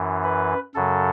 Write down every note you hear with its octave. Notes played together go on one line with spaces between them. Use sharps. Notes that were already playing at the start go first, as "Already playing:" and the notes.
Already playing: F#2 E3
B4
F#2 C#3 F#3 A4